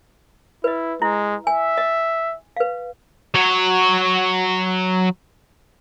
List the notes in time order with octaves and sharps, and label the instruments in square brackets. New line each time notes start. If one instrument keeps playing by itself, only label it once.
[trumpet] E4 [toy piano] B4 D#5
[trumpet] G#3 [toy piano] E4
[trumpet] E5 [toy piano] G#5
[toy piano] D#5
B4 F5
[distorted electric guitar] F#3 C#5